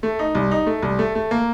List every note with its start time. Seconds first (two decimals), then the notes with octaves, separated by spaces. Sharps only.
0.03 A3
0.19 D#4
0.35 C2
0.51 D#4
0.67 A3
0.82 C2
0.99 A3
1.15 A3
1.31 A#3